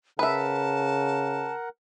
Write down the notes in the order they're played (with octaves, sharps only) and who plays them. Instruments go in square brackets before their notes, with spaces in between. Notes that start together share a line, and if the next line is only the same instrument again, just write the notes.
[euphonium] C#3 [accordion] A#4 F#5 [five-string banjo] B4 E5 [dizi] A5